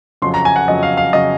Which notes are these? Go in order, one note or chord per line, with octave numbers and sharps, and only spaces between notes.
F2 C#3 F#3 C6
A#5
G#5
F#5
F2 C#3 F#3 D#5
F5
F5
C#3 F#3 D#5